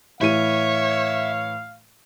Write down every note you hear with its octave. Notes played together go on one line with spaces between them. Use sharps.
A2 E3 C#5 E5 F5 D#7